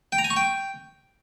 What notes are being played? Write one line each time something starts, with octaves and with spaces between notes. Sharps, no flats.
G5
A#5
G#5
C#6
G5